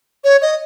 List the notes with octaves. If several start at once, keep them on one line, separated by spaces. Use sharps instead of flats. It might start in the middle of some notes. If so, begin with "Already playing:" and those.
C#5
D#5